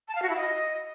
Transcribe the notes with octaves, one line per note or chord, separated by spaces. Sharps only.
A5
F5
F#4
E4
D#5